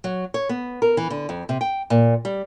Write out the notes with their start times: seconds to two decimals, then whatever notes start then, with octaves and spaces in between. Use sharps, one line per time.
0.04 F#3
0.34 C#5
0.49 B3
0.82 A#4
0.97 E3
1.10 D3
1.29 F2
1.49 C3
1.61 G5
1.90 A#2
2.25 G3